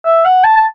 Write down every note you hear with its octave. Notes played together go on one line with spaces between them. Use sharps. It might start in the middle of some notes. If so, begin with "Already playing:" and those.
E5
F#5
A5
A5